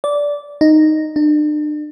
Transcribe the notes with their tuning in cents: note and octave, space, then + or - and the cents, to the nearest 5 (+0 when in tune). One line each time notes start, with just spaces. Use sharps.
D5 -15
D#4 -5
D4 +40